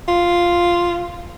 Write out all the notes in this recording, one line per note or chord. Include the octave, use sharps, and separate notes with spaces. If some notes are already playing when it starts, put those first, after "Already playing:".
F4